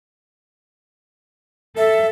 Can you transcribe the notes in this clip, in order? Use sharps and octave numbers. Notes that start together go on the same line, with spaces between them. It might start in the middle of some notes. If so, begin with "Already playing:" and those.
A4 E5